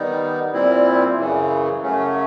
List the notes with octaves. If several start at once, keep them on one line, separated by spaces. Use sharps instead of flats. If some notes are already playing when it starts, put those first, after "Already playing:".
Already playing: D#3 G3 B3 D#4
A#2 G3 C4 E4
F#2 C#3 E3
F#2 C#3 F#3 A3 C#4